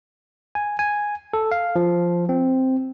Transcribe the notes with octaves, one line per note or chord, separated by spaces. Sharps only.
G#5
G#5
A4
F5
F3
C4